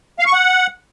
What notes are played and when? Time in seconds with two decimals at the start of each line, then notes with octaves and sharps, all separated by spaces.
0.19 F5
0.26 C#6
0.33 F#5